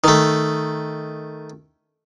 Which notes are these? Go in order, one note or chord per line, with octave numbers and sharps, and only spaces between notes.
D#3 A3